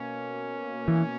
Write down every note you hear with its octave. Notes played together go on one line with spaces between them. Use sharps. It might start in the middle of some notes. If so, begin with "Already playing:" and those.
Already playing: B2 A#3 C#4
E3